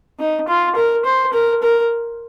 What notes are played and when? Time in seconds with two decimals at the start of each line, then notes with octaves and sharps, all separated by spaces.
0.19 D#4
0.48 F4
0.76 A#4
1.05 C5
1.33 A#4
1.63 A#4